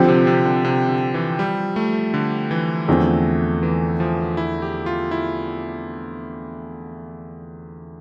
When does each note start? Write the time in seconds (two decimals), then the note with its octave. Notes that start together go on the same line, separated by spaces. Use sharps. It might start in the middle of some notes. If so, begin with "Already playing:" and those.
Already playing: D3 F3 C4 G4
0.08 C3
0.27 C3
0.45 D3
0.65 C3
0.89 D3
1.14 E3
1.39 G3
1.76 A3
2.14 D3
2.51 E3
2.88 E2 D3 F3 A3 C4
3.63 E3
4.00 F3
4.37 E4
4.62 G4
4.86 F4
5.11 E4